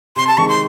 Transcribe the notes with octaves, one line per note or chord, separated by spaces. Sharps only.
C3 C6
A5
D#3 G#3 C4 C#6
C6